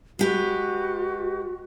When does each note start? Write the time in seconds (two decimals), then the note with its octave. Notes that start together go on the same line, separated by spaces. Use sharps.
0.19 G#3 F#4 G4 B4